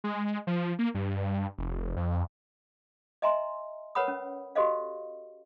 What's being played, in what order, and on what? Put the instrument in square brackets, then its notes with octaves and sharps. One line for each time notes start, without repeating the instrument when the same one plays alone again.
[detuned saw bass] G#3
F3
A#3
G2
F1
F2
[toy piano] D#5 E5 G#5 A#5 C6
A#4 B4 C#5 F#5 B5 D#6
C#4
F#4 G4 A4 C5 D#5 F5